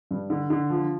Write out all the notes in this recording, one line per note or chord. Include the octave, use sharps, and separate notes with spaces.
G2
D3
D3
F3